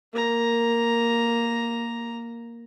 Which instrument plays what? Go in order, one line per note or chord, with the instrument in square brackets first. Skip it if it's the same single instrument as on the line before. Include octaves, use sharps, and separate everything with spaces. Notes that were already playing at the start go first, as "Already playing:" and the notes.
[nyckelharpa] A#3 A#5